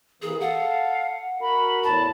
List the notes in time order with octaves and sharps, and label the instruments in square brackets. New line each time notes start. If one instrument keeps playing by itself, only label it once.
[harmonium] C3 E3 A#3 [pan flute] G#4
[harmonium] A4 [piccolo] F5 [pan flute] F#5
[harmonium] F#4 A#4 [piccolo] B5
[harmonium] E2 A2 [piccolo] A5 [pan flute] B5